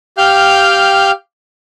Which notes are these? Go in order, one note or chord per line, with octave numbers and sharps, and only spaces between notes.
G4 F5 G5 F6 G6